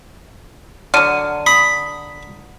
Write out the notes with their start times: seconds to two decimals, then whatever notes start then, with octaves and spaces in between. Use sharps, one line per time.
0.94 D3 F#3 F6 D#7
1.47 B5 D#6